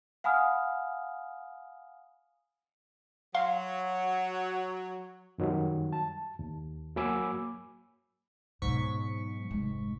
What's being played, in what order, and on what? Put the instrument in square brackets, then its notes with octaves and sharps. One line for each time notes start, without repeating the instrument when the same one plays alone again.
[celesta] F5 F#5 G#5 B5 D#6 F6
[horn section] F#3 [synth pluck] F5 C6
[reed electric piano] F#2 D#3 F#3 G3
A5
D#2
F#3 A#3 G#5 B5 D6 E6
[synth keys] G#2 C#6 B6 [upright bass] B2 F#3
[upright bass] F1 G#3